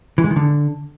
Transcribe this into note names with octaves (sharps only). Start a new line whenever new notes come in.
E3
G#3
D#3
D3